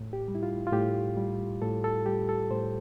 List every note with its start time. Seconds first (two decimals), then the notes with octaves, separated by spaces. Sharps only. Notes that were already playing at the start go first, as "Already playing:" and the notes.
Already playing: A2
0.13 G4
0.28 G3
0.35 E4
0.43 F4
0.67 F4
0.73 A2 G4
1.17 G3
1.62 A2 A4
1.84 A4
2.06 G3 G4
2.29 A4
2.51 A2 C5